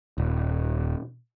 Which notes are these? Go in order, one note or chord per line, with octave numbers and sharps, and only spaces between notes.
D#1